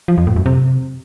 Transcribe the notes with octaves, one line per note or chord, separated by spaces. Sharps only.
F3
F2
A2
F#2
C3